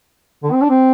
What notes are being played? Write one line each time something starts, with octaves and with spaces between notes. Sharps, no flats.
D3
C4
D4
C4